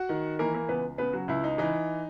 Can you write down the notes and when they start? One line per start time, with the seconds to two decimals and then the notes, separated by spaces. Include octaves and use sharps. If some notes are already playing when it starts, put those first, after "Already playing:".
Already playing: F#4 F#5
0.09 D#3
0.39 E3 A#3 A#4
0.55 A#3 A#4
0.68 C#2 B3 B4
0.98 C#3 B3 B4
1.13 F#3 F#4
1.28 C#2 E4
1.44 D#4
1.58 E3 D#4